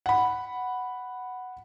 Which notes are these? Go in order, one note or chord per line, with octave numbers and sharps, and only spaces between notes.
F#5 B5